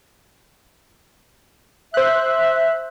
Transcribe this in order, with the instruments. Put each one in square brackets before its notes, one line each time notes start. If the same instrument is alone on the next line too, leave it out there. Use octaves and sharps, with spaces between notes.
[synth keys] C5 F#6 [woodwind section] E5